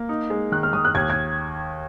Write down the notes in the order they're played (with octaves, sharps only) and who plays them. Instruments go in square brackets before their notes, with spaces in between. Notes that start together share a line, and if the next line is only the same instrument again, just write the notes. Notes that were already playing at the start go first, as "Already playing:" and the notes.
Already playing: [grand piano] A#3
D#4
G#3
[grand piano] D#3 [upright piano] F#6
[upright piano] F6
[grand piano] D#3 [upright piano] D#6
[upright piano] F#6
[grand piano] D#2 [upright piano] G#6
[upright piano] G#6